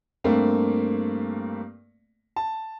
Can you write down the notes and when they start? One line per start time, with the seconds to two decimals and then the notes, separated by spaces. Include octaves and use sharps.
0.24 G2 A3 A#3 C4
2.36 A5